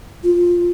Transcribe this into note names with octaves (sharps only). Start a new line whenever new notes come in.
F4